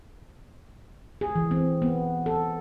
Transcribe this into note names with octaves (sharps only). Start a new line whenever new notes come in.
G#4
E3
C4
B3
A4